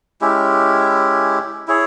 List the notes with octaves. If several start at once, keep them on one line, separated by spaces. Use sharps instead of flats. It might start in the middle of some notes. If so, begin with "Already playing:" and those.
G#3 C#4 E4 G4
E4 G#4 C#5